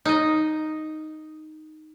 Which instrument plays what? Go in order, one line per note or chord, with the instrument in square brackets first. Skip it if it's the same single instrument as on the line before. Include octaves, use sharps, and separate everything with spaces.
[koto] D#4 D#5